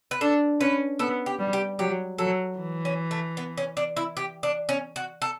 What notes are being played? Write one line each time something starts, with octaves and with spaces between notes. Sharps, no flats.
B4
D4 A4
C#4 B4
B3 A4
G4
G3
G4
F#3 G4
F#3 A4
E3
C#4
A3
B3
C#4
D4
E4
G4
D4
C#4
F#4
A4